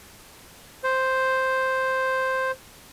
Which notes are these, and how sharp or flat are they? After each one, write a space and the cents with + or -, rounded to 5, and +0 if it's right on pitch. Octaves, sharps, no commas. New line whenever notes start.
C5 +0